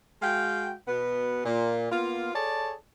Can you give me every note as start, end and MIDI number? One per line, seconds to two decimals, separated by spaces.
0.22 0.74 56
0.22 0.74 66
0.22 0.74 77
0.22 0.74 79
0.88 1.42 47
0.88 1.42 59
1.45 1.90 46
1.92 2.33 58
1.92 2.33 59
1.92 2.33 65
2.35 2.74 68
2.35 2.74 69
2.35 2.74 73
2.35 2.74 74
2.35 2.74 81